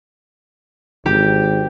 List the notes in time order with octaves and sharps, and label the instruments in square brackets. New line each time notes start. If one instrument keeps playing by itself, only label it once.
[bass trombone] G#1 [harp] G4